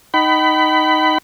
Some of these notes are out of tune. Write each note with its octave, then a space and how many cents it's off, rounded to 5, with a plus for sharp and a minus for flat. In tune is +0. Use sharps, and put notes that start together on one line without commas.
D#4 +0 G5 -45 B5 +15